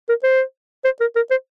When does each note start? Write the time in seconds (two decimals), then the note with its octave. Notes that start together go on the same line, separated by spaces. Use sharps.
0.09 A#4
0.23 C5
0.85 C5
1.01 A#4
1.16 A#4
1.31 C5